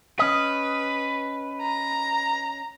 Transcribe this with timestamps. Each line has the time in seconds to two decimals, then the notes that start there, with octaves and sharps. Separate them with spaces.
0.19 C#4 B4 D#5
1.62 A#5